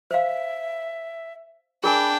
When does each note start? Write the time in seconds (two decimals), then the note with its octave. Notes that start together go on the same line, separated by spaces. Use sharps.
0.11 C5 E5 F5
1.84 D4 G#4 A#4 G5 G#5 B5